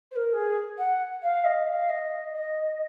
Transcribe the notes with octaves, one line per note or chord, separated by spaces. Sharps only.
C5
A#4
G#4
F#5
F5
D#5
F5
D#5
D#5